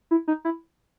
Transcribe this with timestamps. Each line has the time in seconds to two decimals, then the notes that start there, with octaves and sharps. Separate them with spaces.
0.11 E4
0.28 D#4
0.45 E4